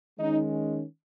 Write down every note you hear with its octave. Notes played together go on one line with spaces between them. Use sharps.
D#3 G#3 C#4 D#4